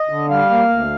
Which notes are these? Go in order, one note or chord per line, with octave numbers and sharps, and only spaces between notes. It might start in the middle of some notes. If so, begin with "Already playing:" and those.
Already playing: D#5
D3
G3 F5
A#3
D2